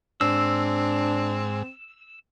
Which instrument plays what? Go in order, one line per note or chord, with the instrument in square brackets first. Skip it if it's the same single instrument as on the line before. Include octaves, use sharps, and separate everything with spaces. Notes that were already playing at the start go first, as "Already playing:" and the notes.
[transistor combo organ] G#2 [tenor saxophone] C4 [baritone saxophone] D4 [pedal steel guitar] E6